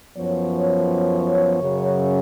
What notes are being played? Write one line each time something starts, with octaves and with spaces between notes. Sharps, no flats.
F#2 F3 B3 C#5
F#2 C#3 F#3